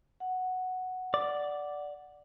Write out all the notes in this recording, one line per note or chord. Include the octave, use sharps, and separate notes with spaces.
F#5
D5